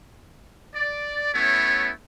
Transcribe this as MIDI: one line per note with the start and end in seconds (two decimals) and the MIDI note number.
0.75 1.29 74
1.34 1.91 57
1.34 1.91 59
1.34 1.91 61
1.34 1.91 64
1.34 1.91 73